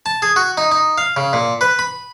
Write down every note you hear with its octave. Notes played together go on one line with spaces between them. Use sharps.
A5
G#4
F#4
D#4
D#4
F5
C#3
A#2
B4
B5